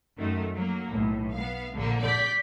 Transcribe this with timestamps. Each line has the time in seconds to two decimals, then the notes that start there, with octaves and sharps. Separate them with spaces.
0.18 F#2 D#3 A3
0.53 F#3 A#3
0.89 B1 A2
1.33 B3 F5
1.73 A#1 D3 A#3
2.02 D5 G6 B6